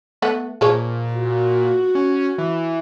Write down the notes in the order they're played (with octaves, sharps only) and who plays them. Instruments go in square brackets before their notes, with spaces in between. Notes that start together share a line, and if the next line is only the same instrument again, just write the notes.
[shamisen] A3 B3 F#5
[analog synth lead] A#2 [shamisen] F3 G#4 C#5
[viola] F#4
[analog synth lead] C#4
E3